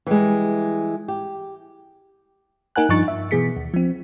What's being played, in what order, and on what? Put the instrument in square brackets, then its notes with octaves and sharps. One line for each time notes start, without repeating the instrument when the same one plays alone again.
[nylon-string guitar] E3 G3 G#3
G4
[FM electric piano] A#3 D#4 A#4 F#5 G#5 F#6
G2 F3 D4 D#4 C#6 A6
E5
B2 E3 B3 G#4 B6 C#7
D#2
F3 C4